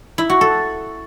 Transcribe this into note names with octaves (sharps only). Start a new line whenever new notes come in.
E4
F#4
A4